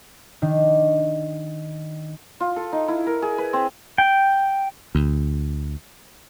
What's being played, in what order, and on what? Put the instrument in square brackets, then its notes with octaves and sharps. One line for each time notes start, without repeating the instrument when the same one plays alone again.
[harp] D#3 D4
[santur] F4
A4
D#4
E4
A#4
G#4
B4
C4
[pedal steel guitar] G5
[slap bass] D2